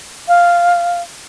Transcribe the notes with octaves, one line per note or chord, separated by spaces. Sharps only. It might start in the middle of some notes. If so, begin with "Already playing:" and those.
F5